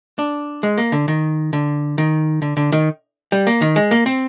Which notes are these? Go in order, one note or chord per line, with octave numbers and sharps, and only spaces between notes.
D4
G#3
A#3
D3
D#3
D3
D#3
D3
D3
D#3
G3
A#3
D#3
G#3
A#3
C4